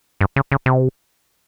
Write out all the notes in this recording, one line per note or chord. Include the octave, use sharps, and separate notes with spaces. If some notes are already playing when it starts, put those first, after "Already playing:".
G2
C#3
C#3
C3